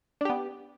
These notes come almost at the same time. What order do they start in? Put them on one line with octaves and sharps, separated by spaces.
D4 G4 B3